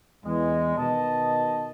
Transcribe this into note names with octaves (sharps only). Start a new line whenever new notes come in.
E2 G#3
B2 D#3 B3 D#5 A5